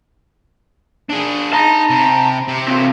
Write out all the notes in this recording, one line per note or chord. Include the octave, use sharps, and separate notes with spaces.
D4 G#4
D#4 A5 A#5
C3
C3
E3 C4